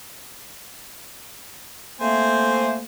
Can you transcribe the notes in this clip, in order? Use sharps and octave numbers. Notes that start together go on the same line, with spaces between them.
A3 A#3 C4 C5 G#5